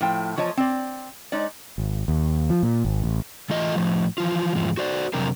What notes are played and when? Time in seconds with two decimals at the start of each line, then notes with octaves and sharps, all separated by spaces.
0.01 A2 F3 G5
0.37 E2 F3 C#5 D#5 A5
0.57 C4 D5
1.32 G#3 D#4 C#5 D5
1.78 G#1
2.08 D#2
2.50 F3
2.63 A#2
2.85 G#1
3.04 A1
3.50 E3 A3 F4 D#5
3.75 A2 F3
4.18 E3 F3 F4
4.55 E2 G#2 F3
4.77 F#4 C5 D5
5.14 F2 C3 F#3 C4 D4 A#4